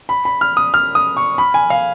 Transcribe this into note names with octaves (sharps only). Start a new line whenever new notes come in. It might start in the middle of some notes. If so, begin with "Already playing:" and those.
B5
B5
F6
D#6
F6
D#6
C#6
B5
G#5
F5